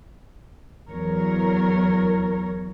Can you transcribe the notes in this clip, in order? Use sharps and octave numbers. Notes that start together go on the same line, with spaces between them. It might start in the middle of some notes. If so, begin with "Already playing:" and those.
E2 F#3 A#4 C#5